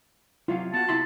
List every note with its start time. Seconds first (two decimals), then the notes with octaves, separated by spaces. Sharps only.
0.48 C3 F#3 F4 F5
0.74 B3 F#4 A5
0.89 C3 E4 C6